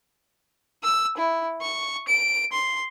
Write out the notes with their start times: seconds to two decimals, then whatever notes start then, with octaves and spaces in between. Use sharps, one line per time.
0.83 E6
1.17 E4
1.61 C#6
2.08 D7
2.52 C6